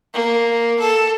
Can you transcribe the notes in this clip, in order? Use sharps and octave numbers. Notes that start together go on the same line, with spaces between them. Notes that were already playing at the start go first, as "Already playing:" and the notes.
A#3
A4